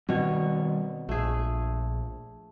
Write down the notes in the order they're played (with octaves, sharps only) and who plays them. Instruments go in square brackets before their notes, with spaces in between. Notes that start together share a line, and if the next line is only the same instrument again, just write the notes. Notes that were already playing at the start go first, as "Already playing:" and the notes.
[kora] B2 C#5 [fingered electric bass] D#3 G3 C4
[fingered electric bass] A#1 [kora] A3 G#4